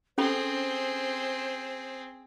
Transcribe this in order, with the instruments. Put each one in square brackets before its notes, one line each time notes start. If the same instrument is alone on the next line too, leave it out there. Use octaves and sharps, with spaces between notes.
[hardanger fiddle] C4 G#4 [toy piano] C#4 A4 B5 [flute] C5